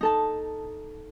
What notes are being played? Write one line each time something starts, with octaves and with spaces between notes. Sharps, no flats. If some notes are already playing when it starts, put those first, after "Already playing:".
D#4 A4 A5